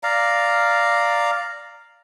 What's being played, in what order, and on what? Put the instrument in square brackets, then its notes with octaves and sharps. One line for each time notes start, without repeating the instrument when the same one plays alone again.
[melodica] D5 F5 A#5